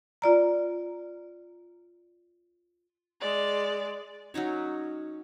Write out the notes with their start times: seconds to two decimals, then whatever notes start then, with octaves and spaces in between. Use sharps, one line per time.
0.22 F4 D5 A#5
3.21 G#3 D5
4.34 F#3 C#4 D#4 C#5